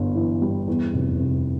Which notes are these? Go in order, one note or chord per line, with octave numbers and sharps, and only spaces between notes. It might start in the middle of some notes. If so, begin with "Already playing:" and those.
Already playing: G1 G2
E3
G3
E2
F1
C3